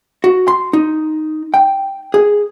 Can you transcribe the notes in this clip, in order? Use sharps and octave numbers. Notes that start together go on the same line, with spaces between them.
F#4
C6
D#4
G5
G#4